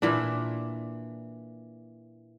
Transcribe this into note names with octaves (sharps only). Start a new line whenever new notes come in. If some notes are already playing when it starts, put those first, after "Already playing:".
A#2 E3 D4